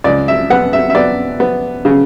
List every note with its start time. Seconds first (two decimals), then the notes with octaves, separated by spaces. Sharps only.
0.04 C#2 D5
0.28 E5
0.50 B3 F#5
0.73 E5
0.90 E5
0.95 B3 D5
1.40 B3
1.85 C#3